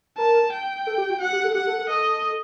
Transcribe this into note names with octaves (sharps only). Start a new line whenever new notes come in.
A#4 A5
G5
A4
G4
F#4
F#4 F#5
G4
A4
G4 F#5
A4
A4
A4 D#5